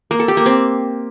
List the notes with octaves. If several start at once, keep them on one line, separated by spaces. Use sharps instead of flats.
A#3
A4
G4
A#3
C4